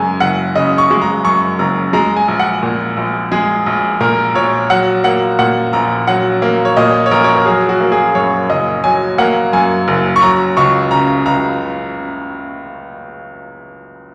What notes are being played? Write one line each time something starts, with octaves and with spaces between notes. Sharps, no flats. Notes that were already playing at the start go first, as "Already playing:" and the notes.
Already playing: F#2 C#3 G#3 G#5
F#1 F#5
C#3 D#5
C#6
G#3
A#5
F#2 C#6
F#1 A#5
G#3 A#5
G#5
A#1
F#5
A#2
A#1
G#3 G#4
A#1
A#2 A#4
A#1 C#5
F#3 F#5
A#3 F#5
A#2 F#5
A#1 A#5
F#3 F#5
A#3
C#5
A#2 D#5
C#5
A#1 A#4
C#5
A#4
F#3 G#4
F#4
A#3
G#4
F#2 C#5
F#1 D#5
F#3 G#5
A#3 F#5
F#2 G#5
F#1
C#6
F#3 A#5
C#2 C#6
C#3 A#5
C#2 A#5